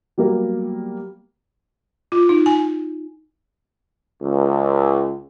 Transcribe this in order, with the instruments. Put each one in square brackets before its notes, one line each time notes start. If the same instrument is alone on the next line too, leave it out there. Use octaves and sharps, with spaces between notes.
[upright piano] F#3 G3 A#3 B3 G4 A#4
[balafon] F4
D#4
G#5
[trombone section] C#2